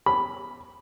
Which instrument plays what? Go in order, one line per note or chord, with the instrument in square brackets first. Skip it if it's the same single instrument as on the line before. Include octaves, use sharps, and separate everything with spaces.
[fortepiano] B5